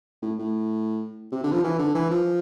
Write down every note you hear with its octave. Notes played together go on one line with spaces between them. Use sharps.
A2
A2
C3
D3
F3
E3
D3
E3
F3